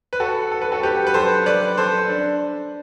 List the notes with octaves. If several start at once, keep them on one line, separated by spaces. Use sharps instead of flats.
B4
F#4 A4
A4
B4
F#4 A4
G4 B4
B4
A4 C5
B4 D5
A4 C5
D4